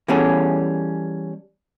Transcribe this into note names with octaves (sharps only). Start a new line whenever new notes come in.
E3 G3 B3 C#4 G#4 A4